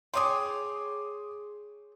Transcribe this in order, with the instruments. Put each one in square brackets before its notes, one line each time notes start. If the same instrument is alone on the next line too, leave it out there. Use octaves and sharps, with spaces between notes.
[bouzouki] G#4 C#5 G5 [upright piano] C6 D6 D#6